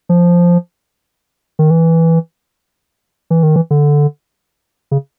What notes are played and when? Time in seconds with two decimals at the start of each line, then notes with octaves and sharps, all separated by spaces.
0.09 F3
1.59 D#3
1.71 E3
3.30 E3
3.43 D#3
3.56 E3
3.71 D3
4.91 C#3